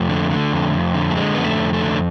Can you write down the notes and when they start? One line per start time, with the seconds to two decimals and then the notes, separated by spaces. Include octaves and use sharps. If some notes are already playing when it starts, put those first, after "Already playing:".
Already playing: F2 A3
0.09 D3
0.30 D3
0.53 F2
0.73 F2
0.95 D3
1.11 A3
1.16 D3 G#3
1.34 F2 B3
1.45 A3
1.59 F2
1.73 A3
1.81 D3